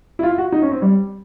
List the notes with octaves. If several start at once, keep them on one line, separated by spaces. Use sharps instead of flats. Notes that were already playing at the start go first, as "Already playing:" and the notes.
E4
F4
F#4
D#4
C#4
C4
G3